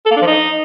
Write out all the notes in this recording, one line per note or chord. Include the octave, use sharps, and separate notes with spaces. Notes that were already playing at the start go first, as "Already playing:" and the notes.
A4
A#3
D4
F3
D#4